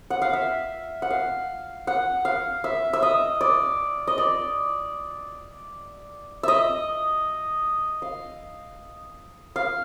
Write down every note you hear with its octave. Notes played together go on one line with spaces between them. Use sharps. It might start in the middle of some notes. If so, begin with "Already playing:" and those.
F#5
F5
E5
F#5
F5
F#5
F5
E5
E5
D#5
D5
D#5
D5
D#5 E5
F5
F5